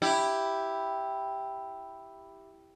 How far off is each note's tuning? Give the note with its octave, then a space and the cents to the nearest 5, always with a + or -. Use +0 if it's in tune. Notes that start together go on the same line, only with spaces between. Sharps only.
E4 +0 G4 +0